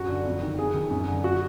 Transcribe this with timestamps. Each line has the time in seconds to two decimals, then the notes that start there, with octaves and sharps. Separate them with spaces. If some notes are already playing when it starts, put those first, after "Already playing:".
Already playing: F#2 F#4
0.08 D3
0.25 F2
0.42 D#3
0.58 F2 G#4
0.74 D#3
0.90 F#2
1.07 D3
1.24 F#4